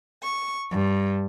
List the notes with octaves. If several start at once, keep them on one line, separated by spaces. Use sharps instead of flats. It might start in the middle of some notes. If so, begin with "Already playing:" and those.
C#6
G2